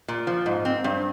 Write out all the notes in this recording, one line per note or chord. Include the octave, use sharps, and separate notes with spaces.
A#2
F3
G#2
C4
G2